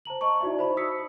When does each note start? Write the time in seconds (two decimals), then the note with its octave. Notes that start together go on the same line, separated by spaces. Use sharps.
0.05 C5 A5 A#5 F#7
0.21 D#5 A5 C#6
0.41 D#4 E4 F#4 D5 E5
0.59 C5 B5
0.77 D#6 E6 B6 C#7